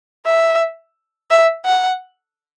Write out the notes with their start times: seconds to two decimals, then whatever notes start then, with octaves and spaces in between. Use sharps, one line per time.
0.26 E5
1.31 E5
1.65 F#5